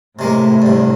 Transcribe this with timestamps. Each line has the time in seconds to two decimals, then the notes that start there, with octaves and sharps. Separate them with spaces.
0.19 A2 C3 G#3 A#3
0.62 G2 C3